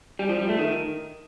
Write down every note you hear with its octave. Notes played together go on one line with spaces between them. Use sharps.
G3
F3
G3
A3
D#3